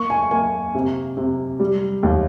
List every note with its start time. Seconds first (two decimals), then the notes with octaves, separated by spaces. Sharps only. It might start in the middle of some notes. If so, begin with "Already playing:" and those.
Already playing: A#3 C#6
0.10 G#5
0.31 A#3 G#5
0.74 C3
1.17 C3
1.60 G3
2.03 D#2